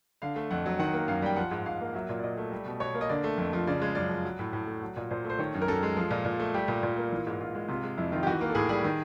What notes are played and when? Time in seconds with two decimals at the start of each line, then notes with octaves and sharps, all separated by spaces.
0.22 D3 F5
0.36 A3
0.51 F2 F#5
0.66 F#3
0.79 D#3 F#5
0.93 A#3
1.08 F#2 F5
1.22 G3 G5
1.36 F3 F#5
1.51 G#2
1.66 G#2 F5
1.81 A#3
1.94 F#3 E5
2.09 A#2
2.19 D5
2.23 A#2 D#5
2.37 A3
2.51 G3
2.66 B2
2.80 B2 C#5
2.94 A#3
3.01 D#5
3.09 D3 D5
3.24 A3
3.38 F2
3.53 F3
3.67 C#3 D5
3.81 G#3
3.95 F#2 D5
4.09 F3
4.25 F#3
4.39 A2
4.53 A2
4.67 A3
4.82 F#3
4.96 A#2
5.10 A#2 C5
5.25 A3
5.30 C5
5.39 D#3 C#5
5.54 F#2
5.62 A#4
5.68 F#2 A4
5.83 G#3
5.97 F3
6.11 A#2
6.25 A#2
6.40 A3
6.54 G3 G4
6.68 A#2
6.83 A#2
6.97 A#3
7.12 E3
7.27 G#2
7.40 G#2 F4
7.55 G#3
7.68 C3 F4
7.83 G#3
7.98 F2 E4
8.12 D#3 F4
8.23 G4
8.27 E3 F#4
8.41 A#3
8.50 A4
8.55 A2 G#4
8.69 G3 G#4
8.84 D#3